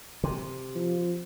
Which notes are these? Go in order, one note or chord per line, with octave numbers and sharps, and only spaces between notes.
C3
F3